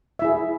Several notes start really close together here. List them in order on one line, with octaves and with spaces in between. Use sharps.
E5 E4 G#4